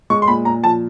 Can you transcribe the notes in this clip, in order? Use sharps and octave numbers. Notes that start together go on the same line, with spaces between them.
G#3 C#6
C6
A#2 B5
A#2 A#5
F3 A5